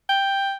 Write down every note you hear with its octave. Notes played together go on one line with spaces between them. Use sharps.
G5